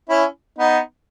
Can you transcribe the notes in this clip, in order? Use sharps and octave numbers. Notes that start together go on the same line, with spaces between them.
C#4 E4
B3 D#4